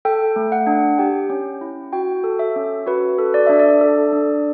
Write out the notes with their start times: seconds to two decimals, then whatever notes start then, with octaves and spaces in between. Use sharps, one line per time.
0.05 A4 G5
0.36 A3
0.52 F#5
0.67 D4
0.98 G4 G5
1.30 C#4
1.61 E4
1.93 F#4 G5
2.24 A4
2.39 E5
2.56 C#4
2.86 F#4 B4
3.19 A4
3.34 D5
3.47 D4 E5
3.59 D5
3.81 A4
4.12 D4